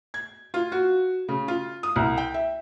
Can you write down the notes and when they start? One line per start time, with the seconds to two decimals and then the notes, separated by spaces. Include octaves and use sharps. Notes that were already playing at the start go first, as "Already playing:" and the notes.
0.14 G#6
0.54 F4
0.72 F#4
1.28 C#3
1.48 F4
1.83 D#6
1.96 C2
2.18 G5
2.34 E5